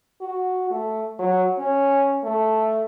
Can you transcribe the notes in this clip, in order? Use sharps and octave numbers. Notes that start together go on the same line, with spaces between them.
F#4
A3
F#3
C#4
A3